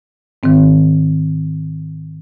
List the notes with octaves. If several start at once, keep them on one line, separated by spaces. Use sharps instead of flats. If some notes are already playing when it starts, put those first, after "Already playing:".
G#2 D#3 C4